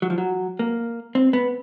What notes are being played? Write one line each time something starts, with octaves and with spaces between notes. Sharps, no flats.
F#3
F3
F#3
A#3
C4
B3